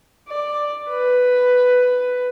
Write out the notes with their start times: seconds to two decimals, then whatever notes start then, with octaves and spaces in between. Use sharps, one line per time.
0.28 D5
0.90 B4